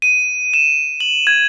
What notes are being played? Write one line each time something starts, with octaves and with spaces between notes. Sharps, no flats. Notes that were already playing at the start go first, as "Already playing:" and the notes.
D#7
E7
F#7
G#6